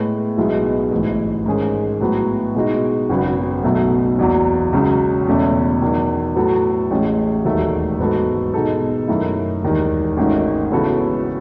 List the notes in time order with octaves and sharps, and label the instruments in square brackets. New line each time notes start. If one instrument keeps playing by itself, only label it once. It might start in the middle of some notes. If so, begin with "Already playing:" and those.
Already playing: [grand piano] A2 G#3 B3
B1 B2 G#3 B3 E4
A1 G#2 E3
G#2 D#3 G#3 C#4 G#4
A2 F#3 B3 F#4
B2 G#3 D#4 F#4
G#1 F#2 C#3 F#3 B3
B1 B2 F#3 A3
F#1 E2 B2 F#3
C#2 C#3 F#3 C#4 F#4
E2 B2 A3 C#4
E2 D#3 F#3
A2 F#3 B3 F#4 A4
A1 A2 G#3 C#4
E1 D#2 D#3 F#3 A3
G#2 F#3 B3 F#4 A4
B2 G#3 D#4 A4
F#2 D#3 A3 E4
E1 D#2 D#3
G#1 G#2 D#3 A3 C#4
C#3 E3 B3 F#4 A4